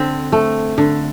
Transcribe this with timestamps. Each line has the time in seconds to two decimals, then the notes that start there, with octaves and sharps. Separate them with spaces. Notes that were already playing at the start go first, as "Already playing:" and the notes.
Already playing: D3 C4
0.32 A3
0.78 D3